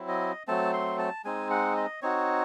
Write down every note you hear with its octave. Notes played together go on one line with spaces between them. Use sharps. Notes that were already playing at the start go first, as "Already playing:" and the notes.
Already playing: F#3 C4 E4
D#5
F#3 A3 C4 A5
C6
A5
G#3 C4 D#4 G#5
F#5
D#5
C4 D#4 F#4 C#5